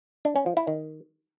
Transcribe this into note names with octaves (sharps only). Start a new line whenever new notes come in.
D4
C#4
F3
E4
D#3